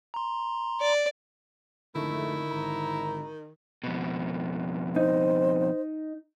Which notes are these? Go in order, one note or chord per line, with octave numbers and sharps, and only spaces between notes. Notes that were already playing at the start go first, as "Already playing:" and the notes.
A#5 C6
D5
G#1 F2 D3 D#3 A3 E4
G#1 A#5
F2 B2
D#4 C5